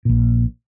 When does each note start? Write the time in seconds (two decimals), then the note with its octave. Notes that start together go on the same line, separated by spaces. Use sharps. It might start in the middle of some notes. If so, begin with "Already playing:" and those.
0.05 A#1 A#2